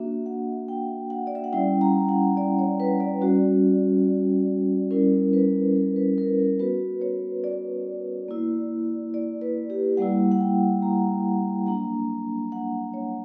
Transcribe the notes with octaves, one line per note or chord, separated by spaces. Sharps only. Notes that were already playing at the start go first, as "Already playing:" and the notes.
Already playing: A#3 D4 F#4 E5
F#5
G5
F#5
D5
E5
F#5
G3 C#4 E4 G5
A#5
F#5
D5
C#5
B4
D5
G3 C#4 F#4
G3 C#4 E4 A#4
B4
A#4
B4
A#4
A#4
B3 F#4 B4
C#5
D5
A#3 E4
D5
B4
G4
G3 A#3 E4 F#5
F#5
G5
A#5
F#3 A#3 D4 A#5
F#5
C#5